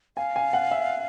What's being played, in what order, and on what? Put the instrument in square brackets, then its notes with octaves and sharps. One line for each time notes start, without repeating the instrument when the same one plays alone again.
[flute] F5 [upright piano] G#5
[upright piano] G#5
F#5
E5